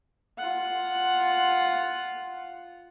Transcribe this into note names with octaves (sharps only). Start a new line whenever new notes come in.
F4 F#5